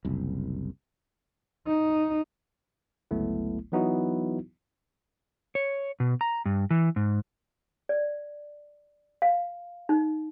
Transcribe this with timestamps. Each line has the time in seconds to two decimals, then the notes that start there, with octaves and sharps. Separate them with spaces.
0.05 F#1 C2
1.67 D#4
3.11 G1 C#2 F#3 A3 B3 E4
3.72 E3 F#3 B3 D#4 E4 F#4
5.55 C#5
6.00 B2
6.21 A#5
6.45 G2
6.71 E3
6.96 G#2
7.89 D5
9.22 F5
9.89 D#4